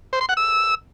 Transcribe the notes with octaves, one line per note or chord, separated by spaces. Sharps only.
C5
C6
F#5
E6